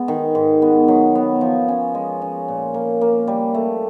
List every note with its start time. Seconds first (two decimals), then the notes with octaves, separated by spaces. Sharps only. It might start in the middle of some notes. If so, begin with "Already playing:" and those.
Already playing: G#3 B3
0.08 D#3
0.35 G#2
0.62 B3
0.88 F#3
1.15 B3
1.41 F3
1.68 C#4
1.95 G#3
2.22 C#4
2.48 A#2
2.74 A#3
3.01 A#3
3.27 G3
3.54 A3